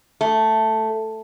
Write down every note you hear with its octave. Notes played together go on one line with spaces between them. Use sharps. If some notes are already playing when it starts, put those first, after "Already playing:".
A3